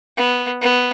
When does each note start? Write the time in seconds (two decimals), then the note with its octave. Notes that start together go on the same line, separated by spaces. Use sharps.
0.17 B3
0.61 B3